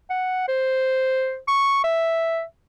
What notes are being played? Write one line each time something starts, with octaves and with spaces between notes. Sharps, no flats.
F#5
C5
C#6
E5